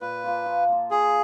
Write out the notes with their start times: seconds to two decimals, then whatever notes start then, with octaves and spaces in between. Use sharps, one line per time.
0.01 A#2 B4
0.24 F3 A#3 F4
0.46 F3
0.68 A#3 F4
0.91 F3 G#4